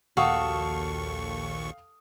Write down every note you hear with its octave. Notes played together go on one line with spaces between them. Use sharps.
A#1 D#2 F#4 A4 F5 G5 C#6 D#6